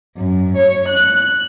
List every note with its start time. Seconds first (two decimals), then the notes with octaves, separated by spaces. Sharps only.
0.17 F#2
0.56 C#5
0.88 F#6